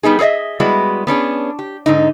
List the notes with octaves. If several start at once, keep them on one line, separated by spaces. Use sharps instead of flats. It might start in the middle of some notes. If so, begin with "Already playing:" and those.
G3 B3 D#4 G#4
G#4 A4 C#5 D#5 E5
G3 G#3 B3 E4 F#4
B3 C#4 D4 G#4
G4
G#2 D3 D#4